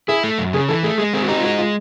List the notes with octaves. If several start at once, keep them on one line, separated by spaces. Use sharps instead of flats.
E4 G#4
A3
F#2
C#3 G#4
E3 A4
A3 G#4
G#3 G#4
C4 G#4
F#4
D#4 G4
F4
G#3 F#4
F4